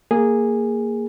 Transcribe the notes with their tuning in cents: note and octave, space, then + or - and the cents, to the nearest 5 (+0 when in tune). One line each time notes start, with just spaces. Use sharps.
A#3 -10 G#4 -10